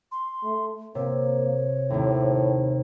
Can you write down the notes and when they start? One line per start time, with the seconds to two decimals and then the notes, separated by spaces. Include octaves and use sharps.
0.12 C6
0.44 A3
0.95 C3 A#3 C#5
1.90 D#2 A2 C3